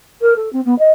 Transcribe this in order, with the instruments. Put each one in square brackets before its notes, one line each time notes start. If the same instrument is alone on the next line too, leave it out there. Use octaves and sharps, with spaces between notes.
[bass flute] A#4
A4
C4
B3
D#5